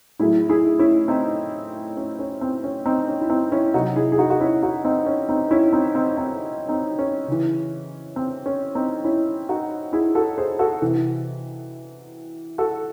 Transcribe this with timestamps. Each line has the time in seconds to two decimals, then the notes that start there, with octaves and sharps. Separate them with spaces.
0.19 A2 F#3 E4 G#4
0.49 E4 G#4
0.79 C#4 E4
1.08 C4 D#4
1.97 C#4
2.19 C#4
2.41 C4
2.64 C#4
2.86 C4 D#4
3.08 C#4
3.21 E4
3.29 C4 D#4
3.52 C#4 E4
3.74 C3 D#4 F#4
3.78 F#3
3.96 E4 G#4
4.12 G#4
4.18 D#4 F#4
4.30 F#4
4.40 C#4 E4
4.62 D#4 F#4
4.84 C4 D#4
5.06 C#4
5.29 C4 D#4
5.51 C#4 E4
5.73 C4 D#4
5.95 C4 D#4
6.17 C4 D#4
6.69 C4 D#4
6.99 C#4
7.28 C#3 E3
8.16 C4
8.46 C#4
8.75 C4 D#4
9.04 C#4 E4
9.49 D#4 F#4
9.93 E4 G#4
10.15 F#4 A4
10.38 G#4 C5
10.59 F#4 A4
10.82 C3 E3
12.58 F#4 A4